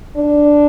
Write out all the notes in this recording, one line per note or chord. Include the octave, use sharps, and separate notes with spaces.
D4